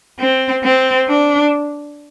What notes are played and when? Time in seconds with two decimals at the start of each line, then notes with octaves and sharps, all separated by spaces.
0.20 C4
0.64 C4
1.09 D4